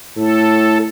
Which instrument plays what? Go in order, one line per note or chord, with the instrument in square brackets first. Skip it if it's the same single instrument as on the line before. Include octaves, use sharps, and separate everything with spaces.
[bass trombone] A2 [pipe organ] A4